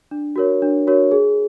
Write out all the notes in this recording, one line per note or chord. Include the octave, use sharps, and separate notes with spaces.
D4
F#4 A#4 C#5
D4
F#4 A#4 C#5
G#4